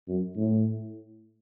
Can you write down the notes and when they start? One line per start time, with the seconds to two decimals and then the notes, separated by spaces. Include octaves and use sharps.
0.08 F#2
0.37 A2